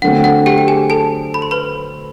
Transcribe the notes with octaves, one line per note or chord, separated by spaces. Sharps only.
D3 F#3 A3 C4 F#5
F#5
G4 G5
G5
G#4 G#5
A4 A5
B5
C6
B4 B5